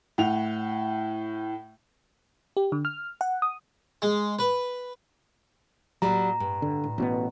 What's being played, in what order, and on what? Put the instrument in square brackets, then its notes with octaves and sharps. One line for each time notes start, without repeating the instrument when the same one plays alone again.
[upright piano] A2 F#5 F7
[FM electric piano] G4
D3
F6
F#5
D#6
[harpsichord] G#3
B4
[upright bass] A2 A#3 [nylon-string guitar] F#3 G3 [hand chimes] A#5
[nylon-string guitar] G2
[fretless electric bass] D3
[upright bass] A2
[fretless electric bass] A1 B2 B3